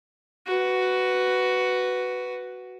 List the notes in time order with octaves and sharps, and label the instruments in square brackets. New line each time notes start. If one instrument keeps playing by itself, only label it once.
[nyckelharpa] F#4 B4